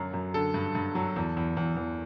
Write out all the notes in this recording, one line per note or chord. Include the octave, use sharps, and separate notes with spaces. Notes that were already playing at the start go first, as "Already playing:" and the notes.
Already playing: F#2 D3 F#3
F#2
D3 A4
G2
G2
F#3
E2
E2
E2
E2